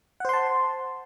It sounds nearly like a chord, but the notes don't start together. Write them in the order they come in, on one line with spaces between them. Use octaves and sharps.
F#5 C5 C6 A5